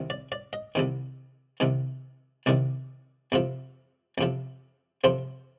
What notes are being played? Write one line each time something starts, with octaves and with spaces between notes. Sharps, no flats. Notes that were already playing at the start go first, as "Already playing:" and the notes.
Already playing: C2 C3 D#3
D5
D5
D#5
C2 C3 D#3
C2 C3 D#3
C2 C3 D#3 D5
F2 C3 F3
F2 C3 F3
F2 C3 F3 C5